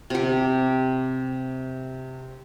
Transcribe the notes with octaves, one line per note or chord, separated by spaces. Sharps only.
C3 G4